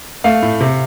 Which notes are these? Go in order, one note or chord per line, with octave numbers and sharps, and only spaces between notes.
A3 F5
A2
C3